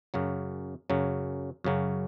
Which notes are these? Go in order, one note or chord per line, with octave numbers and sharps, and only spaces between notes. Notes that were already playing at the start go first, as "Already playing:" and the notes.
F#2 C#3 F#3
F#2 C#3 F#3
F#2 C#3 F#3